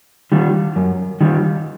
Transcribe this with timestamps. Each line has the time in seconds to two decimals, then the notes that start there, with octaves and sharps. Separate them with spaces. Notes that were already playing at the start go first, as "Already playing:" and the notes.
0.32 D#3 G3
0.76 F#2
1.21 D#3 G3